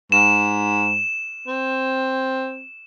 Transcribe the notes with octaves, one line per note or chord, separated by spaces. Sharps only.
G#2 E7
C4